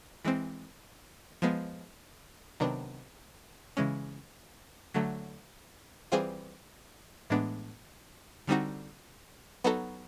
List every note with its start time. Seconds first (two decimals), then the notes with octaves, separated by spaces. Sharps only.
0.25 E3 G#3 C4
1.42 F3 G#3 B3
2.60 C3 D#3 F#3 B3 D4
3.77 C#3 E3 G#3 C#4
4.94 D3 F#3 A3
6.12 E3 G3 C4 F4 G#4
7.30 A2 E3 G#3 B3 D4
8.47 D3 G3 C4 D#4 F#4
9.64 F#3 B3 D#4 F#4 A4